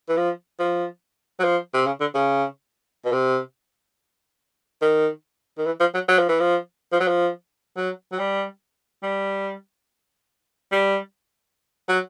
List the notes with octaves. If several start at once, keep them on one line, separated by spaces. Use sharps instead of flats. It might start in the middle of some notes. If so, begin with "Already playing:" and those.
E3
F3
F3
F#3
F3
C3
C#3
D3
C#3
B2
C3
D#3
D#3
E3
F3
F#3
F#3
F3
E3
F3
F3
F#3
F3
F#3
F#3
G3
G3
G3
F#3